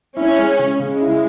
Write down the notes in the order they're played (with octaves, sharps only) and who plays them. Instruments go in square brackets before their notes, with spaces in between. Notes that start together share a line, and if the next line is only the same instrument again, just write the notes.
[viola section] C#4 [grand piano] E4
[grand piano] G#3
C#3
[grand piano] C#3 [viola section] G#3
[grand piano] E4